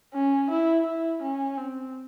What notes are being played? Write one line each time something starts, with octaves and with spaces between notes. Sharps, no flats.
C#4
E4
E4
C#4
C4